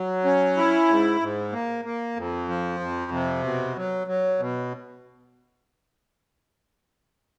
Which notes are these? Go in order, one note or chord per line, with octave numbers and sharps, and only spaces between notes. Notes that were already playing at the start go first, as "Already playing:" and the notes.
Already playing: F#3
C#4
E4
G#2
G#2
A#3
A#3
F2
F3
F2
C3
B2
F#3
F#3
B2